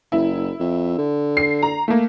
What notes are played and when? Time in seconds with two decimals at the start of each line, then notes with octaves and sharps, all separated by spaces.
0.12 F#1 E4
0.60 F2
0.99 D3
1.37 C7
1.63 A#5
1.88 A3 A#3